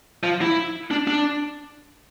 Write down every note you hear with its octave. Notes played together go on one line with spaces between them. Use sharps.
F3
E4
D4
D4